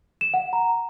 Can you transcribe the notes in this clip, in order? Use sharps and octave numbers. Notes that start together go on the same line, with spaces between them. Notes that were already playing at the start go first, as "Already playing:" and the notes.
E7
F#5
A#5